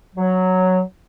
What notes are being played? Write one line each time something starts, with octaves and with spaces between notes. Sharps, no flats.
F#3